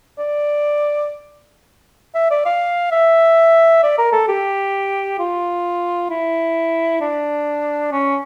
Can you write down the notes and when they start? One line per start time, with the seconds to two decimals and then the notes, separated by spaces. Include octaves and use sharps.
0.18 D5
2.15 E5
2.31 D5
2.46 F5
2.91 E5
3.83 D5
3.98 A#4
4.13 A4
4.28 G4
5.19 F4
6.10 E4
7.01 D4
7.92 C#4